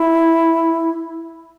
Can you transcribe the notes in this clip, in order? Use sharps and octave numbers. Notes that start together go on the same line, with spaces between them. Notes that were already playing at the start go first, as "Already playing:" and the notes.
Already playing: E4